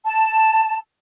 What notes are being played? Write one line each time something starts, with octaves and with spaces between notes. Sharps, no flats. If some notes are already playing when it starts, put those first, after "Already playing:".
A5